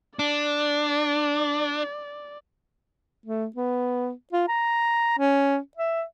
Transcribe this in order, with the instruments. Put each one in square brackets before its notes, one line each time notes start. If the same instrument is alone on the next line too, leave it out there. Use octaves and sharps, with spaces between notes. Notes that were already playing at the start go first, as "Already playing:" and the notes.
[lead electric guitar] D4 [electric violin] D5
[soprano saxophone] A3
B3
F4
A#5
C#4
E5